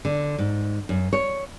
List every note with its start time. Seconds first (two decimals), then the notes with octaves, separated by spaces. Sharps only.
0.05 D3
0.38 G#2
0.89 F#2
1.13 C#5